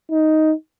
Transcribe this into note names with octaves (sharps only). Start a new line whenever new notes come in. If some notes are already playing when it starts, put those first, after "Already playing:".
D#4